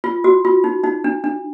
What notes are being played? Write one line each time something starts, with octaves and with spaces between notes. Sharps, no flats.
F4
F#4
F4
D#4
D#4
D4
D4